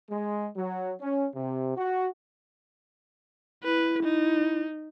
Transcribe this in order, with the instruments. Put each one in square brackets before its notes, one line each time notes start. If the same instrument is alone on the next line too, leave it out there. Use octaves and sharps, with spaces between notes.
[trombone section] G#3
F#3
C#4
C3
F#4
[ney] E4 [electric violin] B4
[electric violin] D#4